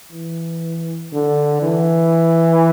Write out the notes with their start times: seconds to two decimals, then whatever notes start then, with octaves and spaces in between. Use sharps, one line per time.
0.12 E3
1.13 D3
1.63 E3